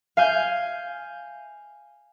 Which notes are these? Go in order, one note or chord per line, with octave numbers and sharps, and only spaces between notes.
F5 G#5 G6